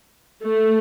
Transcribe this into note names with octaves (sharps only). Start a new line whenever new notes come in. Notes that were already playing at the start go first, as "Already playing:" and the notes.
A3